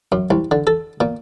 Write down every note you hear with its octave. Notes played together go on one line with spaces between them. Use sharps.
F#2
C2
D3
A4
A#2